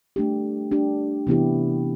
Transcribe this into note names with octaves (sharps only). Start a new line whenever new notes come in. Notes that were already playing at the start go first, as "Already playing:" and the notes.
A3 D4 G4
A3 D4 G4
C3 E3 B3 E4 G4